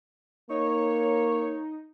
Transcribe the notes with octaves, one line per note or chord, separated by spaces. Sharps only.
A#3 D#4 C#5